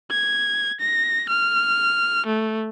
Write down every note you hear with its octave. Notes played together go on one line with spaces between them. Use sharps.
G#6
A#6
F6
A3